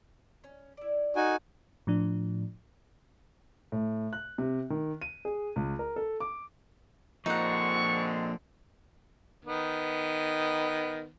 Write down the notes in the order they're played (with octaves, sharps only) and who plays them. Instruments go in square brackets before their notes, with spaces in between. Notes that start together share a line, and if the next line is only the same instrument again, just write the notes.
[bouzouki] C#4
E4 D5
[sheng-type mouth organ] D#4 F#4 G#5 [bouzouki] A4 A#4 D#5
[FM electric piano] A2 F3 D4
[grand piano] A2
F#6
C3
D#3
D#7
G#4
C#2
A#4
A4
D6
[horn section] D3 G#3 C4 [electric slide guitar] F3 A#3 [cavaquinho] D#4 F#5 [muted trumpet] C#6
[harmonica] D#3 B3